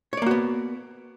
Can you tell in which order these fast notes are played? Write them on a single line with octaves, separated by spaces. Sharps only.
C#5 D5 A#3 F#4 B3